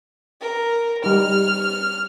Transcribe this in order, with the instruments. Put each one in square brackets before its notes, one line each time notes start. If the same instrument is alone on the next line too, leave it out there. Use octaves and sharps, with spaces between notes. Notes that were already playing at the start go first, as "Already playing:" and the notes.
[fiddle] A#4
[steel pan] G3 D#4 [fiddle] F6